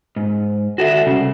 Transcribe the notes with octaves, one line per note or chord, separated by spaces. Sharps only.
G#2
F#4 A4 E5
C2 C#3